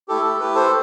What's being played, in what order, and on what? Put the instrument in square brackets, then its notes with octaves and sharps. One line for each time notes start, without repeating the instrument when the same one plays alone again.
[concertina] A3 E4 G4 A4
A4
A3 E4 G4 B4
A4 C5